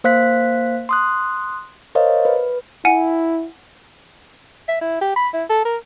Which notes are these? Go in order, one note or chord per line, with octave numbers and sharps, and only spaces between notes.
A#3 C5 F5 F#6 B6
C6 D#6 F#6
A#4 C5 C#5 D#5 F5
B4
E4 F#5 G#5
E5
E4
G4
B5
E4
A4
A#4